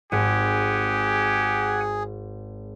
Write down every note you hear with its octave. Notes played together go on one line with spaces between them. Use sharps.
G#1 G4 G#4 F#5 G#5